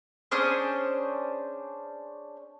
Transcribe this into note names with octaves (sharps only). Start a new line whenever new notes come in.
C#4 D4 G#4 C5